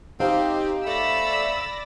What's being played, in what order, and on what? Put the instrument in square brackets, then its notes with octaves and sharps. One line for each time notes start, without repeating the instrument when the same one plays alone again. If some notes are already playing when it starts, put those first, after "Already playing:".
[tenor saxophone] C4 [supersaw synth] D#4 G4 [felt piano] C5 F5
[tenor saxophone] A3 [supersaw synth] D5 A6 A#6 [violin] B5 E6